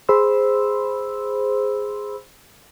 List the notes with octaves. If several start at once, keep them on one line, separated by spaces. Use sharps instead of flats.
G#4 C5 B5 C6 E6